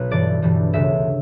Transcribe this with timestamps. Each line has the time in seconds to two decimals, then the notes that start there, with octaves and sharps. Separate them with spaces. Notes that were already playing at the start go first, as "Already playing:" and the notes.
Already playing: B1 B2 B4
0.11 G1 G2 E3 G3 D5
0.42 G1 G2 E3 G3
0.73 E1 D2 C#3 E5